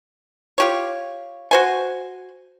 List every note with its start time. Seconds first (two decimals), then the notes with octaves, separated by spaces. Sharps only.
0.58 F4 G4 C#5
1.51 F#4 C5 G#5